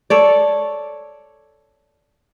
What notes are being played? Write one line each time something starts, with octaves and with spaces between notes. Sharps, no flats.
A4 C#5 D5